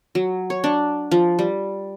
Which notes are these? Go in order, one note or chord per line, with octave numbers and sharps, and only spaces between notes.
F#3
C#5
D4
F3
G3